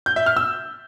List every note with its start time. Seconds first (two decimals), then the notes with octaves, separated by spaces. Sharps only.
0.06 G6
0.16 E5
0.26 F6
0.37 E6